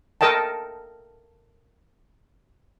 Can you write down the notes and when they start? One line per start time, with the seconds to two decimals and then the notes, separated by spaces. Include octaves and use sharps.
0.21 A4 A#4 D#5 G5 A5